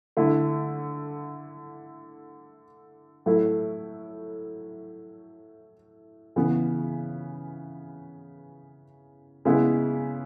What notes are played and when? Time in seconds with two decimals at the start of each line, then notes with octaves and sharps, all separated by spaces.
0.17 D3 A3 E4
3.26 A2 F#3 A3 E4
6.36 C#3 E3 B3
9.45 C#3 G#3 B3 E4